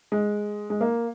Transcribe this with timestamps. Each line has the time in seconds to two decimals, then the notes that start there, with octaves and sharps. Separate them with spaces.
0.12 G#3
0.70 G#3
0.81 A#3